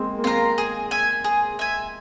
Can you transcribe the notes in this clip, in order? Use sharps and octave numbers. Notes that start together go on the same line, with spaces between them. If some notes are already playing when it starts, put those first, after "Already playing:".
Already playing: G#3 A#3 C4
A#3
C4 F4 A#4
G#4
E5 G#5
G#4
E5 G#5